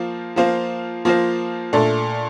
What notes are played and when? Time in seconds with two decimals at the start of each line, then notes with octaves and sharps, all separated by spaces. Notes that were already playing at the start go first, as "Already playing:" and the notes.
Already playing: F3 A#3 F4 C5
0.36 F3 A#3 F4 C5
1.05 F3 A#3 F4 C5
1.73 A#2 A3 D4 A4